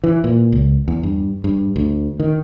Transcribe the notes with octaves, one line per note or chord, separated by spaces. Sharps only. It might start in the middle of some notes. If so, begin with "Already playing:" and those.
E3
A#2
C#2
E2
G2
G2
D2
D#3